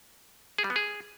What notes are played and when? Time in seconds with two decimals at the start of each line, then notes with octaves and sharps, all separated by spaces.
0.58 G#4
0.64 G3
0.70 B3
0.76 G#4